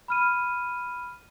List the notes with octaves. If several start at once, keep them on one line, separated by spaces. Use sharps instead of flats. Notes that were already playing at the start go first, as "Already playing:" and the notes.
B5 F6 D#7